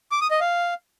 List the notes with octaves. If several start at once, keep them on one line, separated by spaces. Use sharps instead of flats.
D6
D#6
D#5
F5